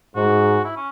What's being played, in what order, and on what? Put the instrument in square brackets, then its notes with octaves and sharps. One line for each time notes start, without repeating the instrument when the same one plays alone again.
[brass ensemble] G#2 [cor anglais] F#4
[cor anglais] E4
C#4